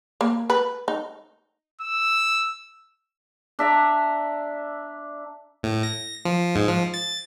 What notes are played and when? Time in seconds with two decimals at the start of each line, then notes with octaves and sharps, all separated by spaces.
0.21 A#3
0.50 B4
0.88 D#4
1.81 E6
3.59 D4 E5 A#5
5.63 A2
5.83 A#6
6.25 F3
6.56 G#2
6.68 F3
6.94 A6